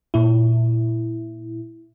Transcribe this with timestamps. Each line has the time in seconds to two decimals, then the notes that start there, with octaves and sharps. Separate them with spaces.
0.14 A#2 E4